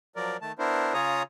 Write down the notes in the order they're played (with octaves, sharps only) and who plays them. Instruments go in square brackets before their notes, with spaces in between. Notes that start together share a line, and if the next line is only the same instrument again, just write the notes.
[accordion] F3 F#3 A#4 D5
D#3 A3 A5
B3 D4 E4 A#4 C5
C#3 F4 G#4 C#5 A#5 D#6